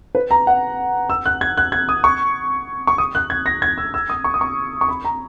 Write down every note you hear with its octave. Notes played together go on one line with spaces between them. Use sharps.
B4
A#5
F#5
E6
F#6
G#6
F#6
G#6
D#6
C#6
C#6
D#6
F#6
G#6
A#6
G#6
E6
E6
D#6
C#6
D#6
C#6
C#6
B5
A#5